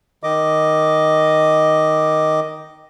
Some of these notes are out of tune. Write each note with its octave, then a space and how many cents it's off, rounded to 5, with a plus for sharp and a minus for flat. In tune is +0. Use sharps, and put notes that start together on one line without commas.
D#3 +0 D#5 +0 D6 +0